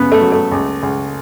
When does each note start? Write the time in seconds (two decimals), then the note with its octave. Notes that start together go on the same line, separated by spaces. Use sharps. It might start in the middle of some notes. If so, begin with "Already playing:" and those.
Already playing: F#2 C#3 B3
0.12 A3
0.21 F#3
0.32 A3
0.52 C#2
0.83 C#2